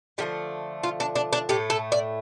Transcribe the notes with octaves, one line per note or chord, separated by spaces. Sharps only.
D3 F3 A3 G4
F4
D4
D4
D4
A2 A3 G4
A4
D5